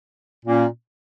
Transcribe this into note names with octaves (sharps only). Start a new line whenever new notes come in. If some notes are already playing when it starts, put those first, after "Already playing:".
A#2 A#3 C#4